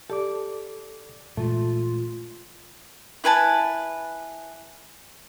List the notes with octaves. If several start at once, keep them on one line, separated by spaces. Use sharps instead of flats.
G4 A4 D5 D6
A#2 E3 G#3 A3 F4
E4 B4 G#5 A5